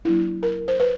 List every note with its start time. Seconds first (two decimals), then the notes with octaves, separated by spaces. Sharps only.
0.05 F#3 A#3 D4 E4
0.43 A#4
0.68 C5
0.80 B4